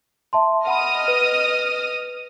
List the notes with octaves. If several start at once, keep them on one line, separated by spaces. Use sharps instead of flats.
E5 A5 C6
D#5 F#5 B5 D#6 F6
B4